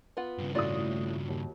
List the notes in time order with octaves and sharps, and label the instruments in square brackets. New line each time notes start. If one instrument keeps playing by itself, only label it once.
[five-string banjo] B3 F4 F#5
[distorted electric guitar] G2 C#3
[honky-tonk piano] A2 A3 D#6 [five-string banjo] F4 F#4 D5
[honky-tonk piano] D#2